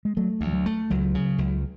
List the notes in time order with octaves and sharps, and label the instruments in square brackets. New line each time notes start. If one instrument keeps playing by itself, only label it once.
[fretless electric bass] G#3
[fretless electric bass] F#3 [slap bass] A3
[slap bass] D2
[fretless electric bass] F3
F#3
[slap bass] A3
[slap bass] C#2 [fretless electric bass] F#3
[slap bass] C#3
C#2